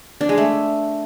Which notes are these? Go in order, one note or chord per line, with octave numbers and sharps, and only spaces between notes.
D4
G#3
A3